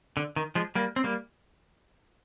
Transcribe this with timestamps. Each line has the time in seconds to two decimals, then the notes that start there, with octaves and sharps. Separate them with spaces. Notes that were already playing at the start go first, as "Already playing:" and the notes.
0.17 D3
0.36 D#3
0.55 F3 G#3
0.75 G3 A#3
0.96 C4
1.04 G3 A#3